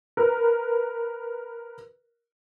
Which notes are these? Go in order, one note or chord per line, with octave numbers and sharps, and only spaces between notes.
A#4 B4